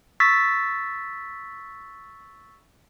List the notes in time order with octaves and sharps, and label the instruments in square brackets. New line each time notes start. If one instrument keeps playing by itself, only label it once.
[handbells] C#6 E6 A6 B6